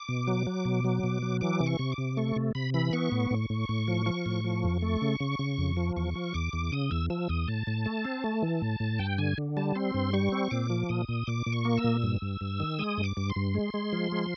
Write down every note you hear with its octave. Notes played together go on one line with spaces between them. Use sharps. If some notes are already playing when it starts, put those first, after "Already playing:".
Already playing: D6
B2
F#3
F#3
B2
F#3
B2
F#3
E3 D6
C3
C#6
C3
D6
C3
A3 C#6
C3
C3 B5
E3 B5
B3 C#6
A2
A2
A2
A2
F3
F3
A2
F3
F2
A3
C#3
C#3
C#3
F2
F3
E2 C#6
F3
E2 D6
E2
C#3 D#6
E2 E6
F3 E6
E2 D#6
A2 A5
A2
A3
C4
A3
E3
A2
A2
G2 G5
D3 G#5
D3
G3 A5
C4 C6
G2
G3 C#6
C4
A#2 D6
F3
A#2 D#6
A#2
A#2 D6
A#2
C#6
A#3
E6
A#2
G2
G2
G2
D#3
G#3 D#6
G2
D6
G2
C6
G2
G#3
G#3
F3
G#3